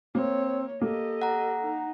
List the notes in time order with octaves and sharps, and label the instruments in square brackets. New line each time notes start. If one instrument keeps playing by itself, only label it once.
[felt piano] A#3 [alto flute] C4 [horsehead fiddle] C#5
[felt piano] A#3 [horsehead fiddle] G4 D#5 [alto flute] A4
[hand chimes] F#5 A#5
[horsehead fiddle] D#4